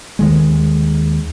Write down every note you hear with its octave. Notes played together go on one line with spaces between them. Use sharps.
D#2 D#3 G#3